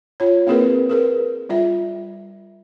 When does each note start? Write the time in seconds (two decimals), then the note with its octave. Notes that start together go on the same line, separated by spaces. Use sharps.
0.20 F4 C#5
0.47 A#3 C4 E4 G#4 A#4 B4
0.89 G#4 A#4 B4
1.49 G3 F4 E5